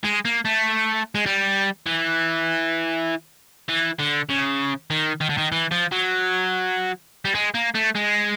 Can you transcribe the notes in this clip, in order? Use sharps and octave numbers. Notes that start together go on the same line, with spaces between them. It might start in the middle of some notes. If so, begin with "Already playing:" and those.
G#3
A#3
A3
G#3
G3
E3
E3
D3
C#3
D#3
D#3
D3
D#3
E3
F3
F#3
G3
G#3
A#3
A3
G#3